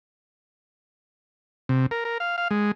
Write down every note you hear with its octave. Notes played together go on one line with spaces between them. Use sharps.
C3
A#4
A#4
F5
F5
G#3